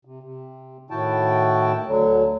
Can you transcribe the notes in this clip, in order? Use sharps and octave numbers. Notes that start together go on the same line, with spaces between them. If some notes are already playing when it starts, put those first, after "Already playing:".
C3
C3
A2 D#3 E4 F#4 G5 A5
D2 D3 F#3